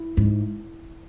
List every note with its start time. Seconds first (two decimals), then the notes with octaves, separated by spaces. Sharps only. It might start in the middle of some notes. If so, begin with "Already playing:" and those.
Already playing: E4
0.17 G#2